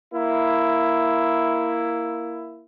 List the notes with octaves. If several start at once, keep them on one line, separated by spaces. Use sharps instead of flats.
A#3 E4